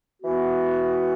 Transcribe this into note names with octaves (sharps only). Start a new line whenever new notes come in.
E3 B3 F#4